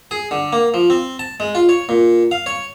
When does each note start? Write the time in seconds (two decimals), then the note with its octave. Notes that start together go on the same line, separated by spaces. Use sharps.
0.11 G#4
0.31 D3
0.53 A#3
0.74 F3
0.90 C4
1.19 A5
1.40 G#3
1.55 F4
1.69 C#5
1.89 A#2
2.31 F5
2.46 C#5